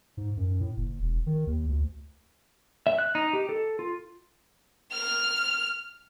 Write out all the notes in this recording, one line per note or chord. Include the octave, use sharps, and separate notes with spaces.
G#2
F#2
A2
F#1
E1
D#3
D#2
D2
E5
F#6
D#4
G4
A4
F4
F6